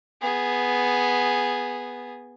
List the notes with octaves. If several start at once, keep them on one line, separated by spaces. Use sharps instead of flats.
B3 G#4